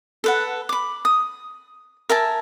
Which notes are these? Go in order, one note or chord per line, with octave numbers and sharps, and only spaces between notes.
A4 B4 F#5
B5 D6
D#6
A#4 E5 G#5 A5